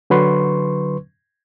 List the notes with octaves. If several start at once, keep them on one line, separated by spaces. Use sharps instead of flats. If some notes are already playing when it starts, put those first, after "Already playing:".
D3 F#3 B4 C6 C#6